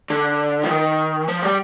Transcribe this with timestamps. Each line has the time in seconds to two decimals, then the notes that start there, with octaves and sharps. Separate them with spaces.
0.10 D3
0.64 F3
0.69 D#3
1.28 F3
1.42 G3